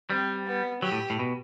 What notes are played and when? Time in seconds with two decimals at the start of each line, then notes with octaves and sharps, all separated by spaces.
0.10 G3 C4
0.46 B3
0.82 F#3 G4
0.92 A2
1.10 A2
1.19 B2